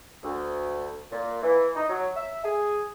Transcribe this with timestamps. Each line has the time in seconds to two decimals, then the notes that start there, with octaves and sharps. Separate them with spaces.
0.24 D2
1.11 A#2
1.43 E3
1.76 D#4
1.89 F#3
2.16 E5
2.44 G#4